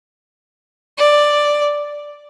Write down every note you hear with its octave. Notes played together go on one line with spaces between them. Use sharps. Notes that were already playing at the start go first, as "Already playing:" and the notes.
D5